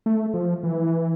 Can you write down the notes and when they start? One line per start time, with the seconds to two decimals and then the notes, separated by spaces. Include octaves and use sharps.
0.06 A3
0.34 F3
0.64 E3